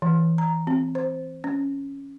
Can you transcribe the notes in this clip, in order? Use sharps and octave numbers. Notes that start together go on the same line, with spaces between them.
E3
A#5
C4
C5
C#4